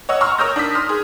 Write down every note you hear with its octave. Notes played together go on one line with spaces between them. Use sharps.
C#5 D#5 F#5 E6
A#5 C6 C#6 E6 F6
A#4 C#5 D#6 E6 G6 A#6
D4 D#6 B6
C6 D#6 F6
G#4